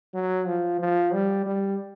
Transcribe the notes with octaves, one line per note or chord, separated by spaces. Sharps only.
F#3
F3
F3
G3
G3